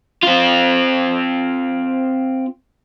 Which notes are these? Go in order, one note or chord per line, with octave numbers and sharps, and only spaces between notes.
C4 F4